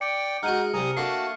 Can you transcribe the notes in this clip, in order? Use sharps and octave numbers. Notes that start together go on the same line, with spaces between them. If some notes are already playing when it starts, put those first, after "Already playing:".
D5 G5 C#7
G#3 D#4 F#4 F#5 F6 D#7
C2 G3 G#5 A#5 D#6
A3 A#3 D4 F#4 A5 C7